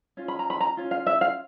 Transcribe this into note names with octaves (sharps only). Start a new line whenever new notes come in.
C#4 F4
B5
A#5
B5
A#5
C#4 F4
F5
E5
F5